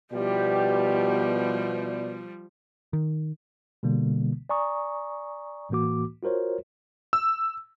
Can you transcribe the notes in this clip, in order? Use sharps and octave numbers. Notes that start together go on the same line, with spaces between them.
B2 F3 G3 B3 E4 G4 D5
D#3
B2 D3 G3 A#3
D5 G#5 A#5 C#6 D#6
A2 E3 A#3 F#4 D6
F4 F#4 A#4 C5 C#5
E6